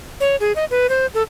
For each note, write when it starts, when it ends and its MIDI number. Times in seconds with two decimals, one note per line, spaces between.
0.20 0.36 73
0.40 0.52 68
0.55 0.65 75
0.71 0.87 71
0.89 1.06 72
1.14 1.22 69